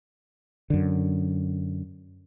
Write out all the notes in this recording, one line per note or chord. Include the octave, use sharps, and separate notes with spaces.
F#2 D3